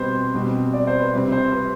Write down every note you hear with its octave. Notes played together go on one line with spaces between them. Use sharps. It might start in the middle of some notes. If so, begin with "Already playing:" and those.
Already playing: B2 G3 C4 B4 C5
B2 G3 C4
D5
C5
B4
C3 G3 C4 C5
C5
B4